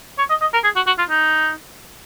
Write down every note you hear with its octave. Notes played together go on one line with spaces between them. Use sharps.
C#5
D#5
D#5
A#4
G#4
F#4
F#4
F4
D#4